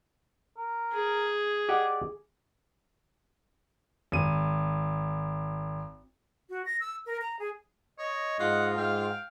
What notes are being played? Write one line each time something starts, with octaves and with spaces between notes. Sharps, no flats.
A#4
G#4
G4 D5 D#5 F#5
G#1 D#7
F#4
A#6
E6
A#4
A#5
G#4
C#5 D#5
G#2 F4 F#5
G#2 F5 G5